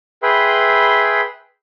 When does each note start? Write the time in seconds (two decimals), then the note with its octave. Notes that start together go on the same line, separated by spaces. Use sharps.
0.23 G#4 B4 E5 G5 B5 C6